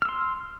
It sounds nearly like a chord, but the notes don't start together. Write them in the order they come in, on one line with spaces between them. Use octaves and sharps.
F6 E6 C6